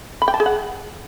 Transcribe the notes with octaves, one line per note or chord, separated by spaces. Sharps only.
B5
G5
A5
G#4
F#5